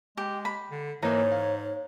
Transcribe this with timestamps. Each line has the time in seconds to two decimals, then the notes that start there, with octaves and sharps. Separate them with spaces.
0.17 G#3 G4
0.45 B5
0.71 D3
1.02 G#2 E3 A#3 D#4 C#5 E5
1.32 F5